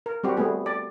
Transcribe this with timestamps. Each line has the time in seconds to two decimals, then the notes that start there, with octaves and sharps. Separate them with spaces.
0.06 A#4
0.24 G3 C4 F#4 G4
0.37 G3 A3 B3 G#4
0.66 D5